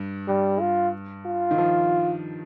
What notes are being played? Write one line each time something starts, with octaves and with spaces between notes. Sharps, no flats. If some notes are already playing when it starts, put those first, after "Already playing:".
Already playing: G2
G2 G3
F4
F4
D#3
F3